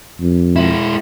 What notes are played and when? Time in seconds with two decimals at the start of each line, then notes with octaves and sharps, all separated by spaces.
0.21 F2
0.56 G#3 E4